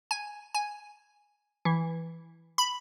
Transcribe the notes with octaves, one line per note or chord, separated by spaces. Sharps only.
G#5
G#5
E3
B5